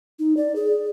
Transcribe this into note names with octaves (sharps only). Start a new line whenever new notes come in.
D#4
D5
G#4